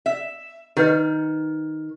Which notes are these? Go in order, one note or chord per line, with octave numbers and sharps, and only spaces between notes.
E5
D#3 G4 B4 D#5